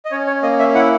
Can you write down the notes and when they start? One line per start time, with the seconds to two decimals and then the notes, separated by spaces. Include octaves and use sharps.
0.05 D#5
0.11 C#4 C#5
0.27 C#5
0.43 A#3 D#5
0.59 E5
0.74 E4 F#5